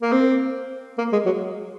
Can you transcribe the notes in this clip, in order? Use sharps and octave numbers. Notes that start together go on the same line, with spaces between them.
A#3
C4
A#3
G#3
F#3